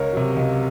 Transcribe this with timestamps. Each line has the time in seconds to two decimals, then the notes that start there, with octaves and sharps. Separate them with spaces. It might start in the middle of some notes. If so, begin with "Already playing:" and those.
Already playing: C#2 A#4 C#5
0.13 C3 F#3
0.36 C#2